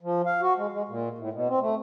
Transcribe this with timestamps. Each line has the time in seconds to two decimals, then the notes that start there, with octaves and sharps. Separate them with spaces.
0.01 F3
0.26 F5
0.42 F#4
0.57 G#3
0.72 G#3
0.89 A#2
1.18 A2
1.33 B2
1.48 C4
1.61 A3